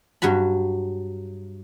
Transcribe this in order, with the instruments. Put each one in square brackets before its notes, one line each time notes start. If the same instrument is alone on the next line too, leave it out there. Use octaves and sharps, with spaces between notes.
[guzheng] G2 F#3 F#4 B5